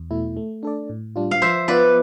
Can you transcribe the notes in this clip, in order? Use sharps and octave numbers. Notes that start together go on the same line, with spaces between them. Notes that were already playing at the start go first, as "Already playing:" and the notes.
Already playing: E2
B2 A3 E4
A3
D4 A4 D5
A2
G3 D4 F4
F5
F3 C5 E5
B3 F4 B4 D5